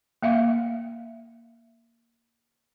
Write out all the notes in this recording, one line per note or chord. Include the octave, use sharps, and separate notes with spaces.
A#3 E5 F5